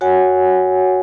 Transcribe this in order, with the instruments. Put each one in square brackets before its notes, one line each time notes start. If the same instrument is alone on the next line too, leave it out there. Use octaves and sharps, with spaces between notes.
[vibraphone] F#4 C#5 F#5 G#5